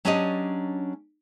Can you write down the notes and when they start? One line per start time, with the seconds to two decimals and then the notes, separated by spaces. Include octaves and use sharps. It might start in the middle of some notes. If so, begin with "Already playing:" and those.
0.05 F#3 C#4 D4 G4 D5 D#5